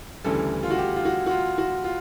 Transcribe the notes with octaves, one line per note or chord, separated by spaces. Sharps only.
D2 C#3 E3 G3 A4
F4
F#4
G4
F4
F#4
F#4
F4
F#4
F4